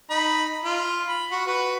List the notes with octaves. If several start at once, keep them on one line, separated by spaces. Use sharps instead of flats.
D#4 B5
F4
B5
F#4
F#4 B4